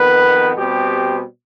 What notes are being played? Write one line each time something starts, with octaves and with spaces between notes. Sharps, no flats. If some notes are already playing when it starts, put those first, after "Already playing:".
Already playing: F2 D#3 B3 B4
B2 G3 C4 G4